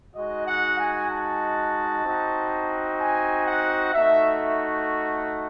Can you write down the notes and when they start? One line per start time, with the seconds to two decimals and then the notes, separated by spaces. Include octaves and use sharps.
0.15 G#3 D#4 F#4 D#5
0.46 F#5
0.78 G#5
1.10 A5
2.04 C4 D#4 F#4
2.99 G#5
3.46 F#5
3.93 A3 D#4 F#4 E5